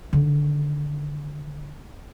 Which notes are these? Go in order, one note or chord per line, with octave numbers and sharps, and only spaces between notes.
D3 D#3